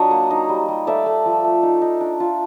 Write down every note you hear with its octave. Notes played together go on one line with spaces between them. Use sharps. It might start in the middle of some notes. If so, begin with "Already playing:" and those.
Already playing: F#3 D4 C#5 D#5
A#3
D#4
G3
G3
A3 D5 E5
A3
F3
A3
D#4
D#4
D4
F4